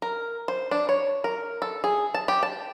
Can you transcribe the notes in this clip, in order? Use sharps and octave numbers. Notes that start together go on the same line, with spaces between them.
A#4
C5
D4
C#5
A#4
A4
G#4
A5
G4
A5